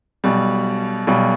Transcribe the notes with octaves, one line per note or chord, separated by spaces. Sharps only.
B1 B2 G3
B1 B2 G3